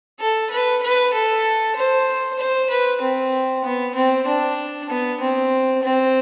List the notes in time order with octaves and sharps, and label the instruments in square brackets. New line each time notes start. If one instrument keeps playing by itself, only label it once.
[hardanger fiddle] A4
B4
B4
A4
C5
C5
B4
C4
B3
C4
D4
B3
C4
C4